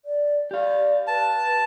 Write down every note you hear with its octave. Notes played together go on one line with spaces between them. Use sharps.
D5
G4 D5 F5
B4 A5